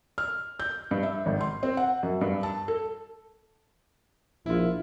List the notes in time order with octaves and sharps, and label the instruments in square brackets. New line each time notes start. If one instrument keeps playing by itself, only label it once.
[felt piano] F6
G6
G2
E5
G#1
C6
C4
F#5
F#2
G2
A5
A4
[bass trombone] A#1 [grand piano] E4 F4